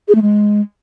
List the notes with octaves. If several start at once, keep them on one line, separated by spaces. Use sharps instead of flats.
G#4
A3
G#3